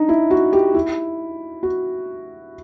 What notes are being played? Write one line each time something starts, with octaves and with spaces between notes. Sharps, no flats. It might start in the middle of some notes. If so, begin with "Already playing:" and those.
Already playing: D4 D#4
E4
F#4
G4
E4
F#4